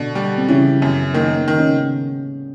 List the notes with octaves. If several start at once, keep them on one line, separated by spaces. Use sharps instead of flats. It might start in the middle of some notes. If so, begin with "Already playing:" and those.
Already playing: B2 D3 D4
G3
C4
C#3 E3 C#4
F#2 B3
D#3 A#3
B3
D#3
C#3 C#4